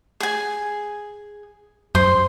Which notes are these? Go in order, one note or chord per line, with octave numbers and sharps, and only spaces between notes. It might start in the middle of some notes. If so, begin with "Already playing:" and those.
G#4 G#5
F#2 C5 C6